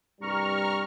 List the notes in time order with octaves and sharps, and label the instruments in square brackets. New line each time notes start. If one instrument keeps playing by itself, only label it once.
[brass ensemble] C2 G2 G3 [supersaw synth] A#5 C#6 F6